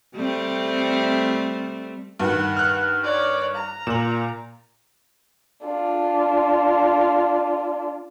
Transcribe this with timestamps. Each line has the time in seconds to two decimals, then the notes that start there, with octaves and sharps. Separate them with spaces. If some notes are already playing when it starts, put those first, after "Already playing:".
0.16 G3 A3 C4
2.19 G2 D#3 F#5
2.57 F6 F#6
3.03 C#5 D5
3.54 A#5
3.87 A#2 E7 F#7
5.66 D4 F4